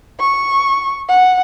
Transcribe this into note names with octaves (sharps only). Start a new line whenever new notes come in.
C#6
F#5